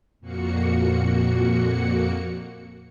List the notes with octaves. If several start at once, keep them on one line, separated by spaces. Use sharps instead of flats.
F2 A#2 A#3 F#4 C#7